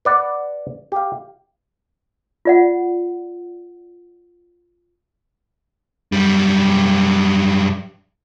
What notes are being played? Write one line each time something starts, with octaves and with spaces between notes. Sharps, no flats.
B4 D5 F#5
G4 F5
F4 D5 F#5
F#2 G3